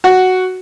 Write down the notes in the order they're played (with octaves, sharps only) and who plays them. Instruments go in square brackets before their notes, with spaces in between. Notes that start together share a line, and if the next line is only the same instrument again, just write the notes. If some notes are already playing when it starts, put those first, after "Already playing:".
[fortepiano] F#4